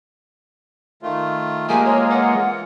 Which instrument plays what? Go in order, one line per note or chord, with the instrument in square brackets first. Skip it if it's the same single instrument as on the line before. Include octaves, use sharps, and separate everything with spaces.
[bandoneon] D#3 A3 F4
[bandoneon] F3 G4 [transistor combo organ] G#3 A#3 [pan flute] G#5
[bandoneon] E3 F4 [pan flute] C#5
[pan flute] F#5